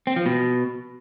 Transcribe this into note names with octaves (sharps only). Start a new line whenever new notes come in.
C4
F3
B2